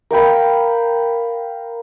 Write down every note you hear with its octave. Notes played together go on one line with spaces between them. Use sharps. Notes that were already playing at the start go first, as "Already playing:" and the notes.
A#4 F5 G5 B5